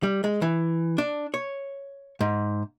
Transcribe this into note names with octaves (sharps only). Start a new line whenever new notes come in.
G3
G#3
E3
D4
C#5
G#2